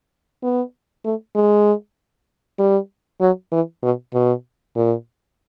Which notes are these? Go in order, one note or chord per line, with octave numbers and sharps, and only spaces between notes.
B3
A3
G#3
G3
F#3
E3
B2
B2
A#2